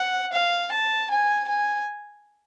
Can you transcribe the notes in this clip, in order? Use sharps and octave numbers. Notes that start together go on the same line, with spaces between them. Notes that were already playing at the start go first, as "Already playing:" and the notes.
Already playing: F#5
F5
A5
G#5
G#5